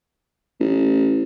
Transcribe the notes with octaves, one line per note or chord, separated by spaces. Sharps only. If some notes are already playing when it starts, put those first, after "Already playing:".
A1